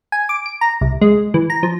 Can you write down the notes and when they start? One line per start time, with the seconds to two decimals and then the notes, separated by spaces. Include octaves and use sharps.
0.12 G#5
0.29 D6
0.46 D7
0.61 A#5
0.81 C2
1.01 G#3
1.34 E3
1.50 A#5
1.63 F3